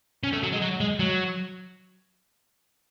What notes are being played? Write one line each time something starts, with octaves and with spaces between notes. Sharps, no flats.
C#4
A3
F#3
G#3
F#3
G#3
F#3